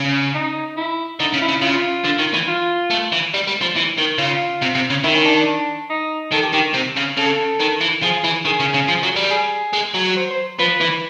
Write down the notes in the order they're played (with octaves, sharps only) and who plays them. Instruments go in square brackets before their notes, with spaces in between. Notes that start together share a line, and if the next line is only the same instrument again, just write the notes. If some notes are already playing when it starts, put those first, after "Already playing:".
Already playing: [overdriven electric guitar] C#3
[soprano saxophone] D#4
E4
[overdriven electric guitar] D3 [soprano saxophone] D#4
[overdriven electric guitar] C#3
[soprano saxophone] E4
[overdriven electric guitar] C#3
[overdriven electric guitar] C#3 [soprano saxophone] F4
[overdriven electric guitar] D3
D#3
E3
[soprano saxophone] F4
[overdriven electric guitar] A3
E3
G3
G3
F3
E3
D#3
[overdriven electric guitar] C#3 [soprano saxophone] F4
[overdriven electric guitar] C3
C3
C#3
[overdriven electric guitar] D#3 [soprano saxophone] E4
[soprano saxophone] C#4
D4
D4
D#4
[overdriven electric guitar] D#3 [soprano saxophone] A4
[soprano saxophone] G4
[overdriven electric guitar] D#3 [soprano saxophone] G4
[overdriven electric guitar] C3
C#3
[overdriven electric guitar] C#3 [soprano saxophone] A4
[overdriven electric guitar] D#3
E3
[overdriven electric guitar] F3 [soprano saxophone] G#4
[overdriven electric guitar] E3
[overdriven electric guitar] D#3 [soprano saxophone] G#4
[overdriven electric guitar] C#3
C#3
F3
F#3
G3
[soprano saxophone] G#4
[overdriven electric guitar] G#3
F#3
[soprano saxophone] C5
C5
[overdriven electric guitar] F3 [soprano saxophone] B4
[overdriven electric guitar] E3